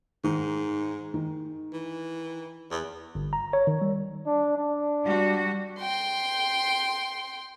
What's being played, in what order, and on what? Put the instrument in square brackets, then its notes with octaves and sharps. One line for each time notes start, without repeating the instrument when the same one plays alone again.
[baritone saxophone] G#2 [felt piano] D#3
[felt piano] D#3
[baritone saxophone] E3
E2
[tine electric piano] G1
A#5
C#5
D#3
G3
[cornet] D4
D4
[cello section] G3 F#4
[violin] G5 C6